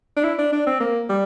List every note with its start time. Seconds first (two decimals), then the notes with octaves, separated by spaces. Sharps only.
0.17 D4
0.24 E4
0.39 D4
0.53 D4
0.67 C4
0.80 A#3
1.09 G3